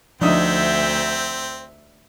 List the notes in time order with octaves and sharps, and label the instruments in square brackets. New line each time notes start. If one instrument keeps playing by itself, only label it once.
[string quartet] D2 E5 G6 [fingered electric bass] F3 [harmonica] C4 [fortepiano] D4 D#4 D#6